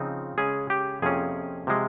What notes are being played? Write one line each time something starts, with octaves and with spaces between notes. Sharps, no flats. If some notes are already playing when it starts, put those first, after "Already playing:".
Already playing: C#3 F3 C4 D#4
C#3 G#3 C#4 G#4
G4
F2 C3 F3 A#3 C#4 G#4
C3 F3 G#3